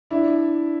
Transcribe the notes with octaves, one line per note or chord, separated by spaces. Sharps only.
D4 E4